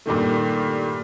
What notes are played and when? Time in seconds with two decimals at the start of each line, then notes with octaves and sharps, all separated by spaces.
0.06 G2 A#2 D#3 A3